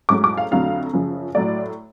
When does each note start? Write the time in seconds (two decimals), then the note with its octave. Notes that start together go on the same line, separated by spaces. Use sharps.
0.09 G#2 F#3 A3 C#4 D6
0.24 D6
0.37 F5
0.51 F2 D3 F#3 A3 F5
0.93 F#2 C#3 F3
1.35 A2 F#3 A3 D5